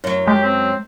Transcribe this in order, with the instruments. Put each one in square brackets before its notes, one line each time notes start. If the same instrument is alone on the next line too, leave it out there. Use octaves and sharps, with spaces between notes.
[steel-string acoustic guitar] F#2 F#3
[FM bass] G#3 [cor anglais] G4
[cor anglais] C4